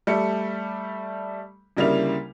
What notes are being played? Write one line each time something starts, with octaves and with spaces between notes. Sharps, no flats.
G3 A3 C#7
D2 C#3 G3 A#3 E4 F7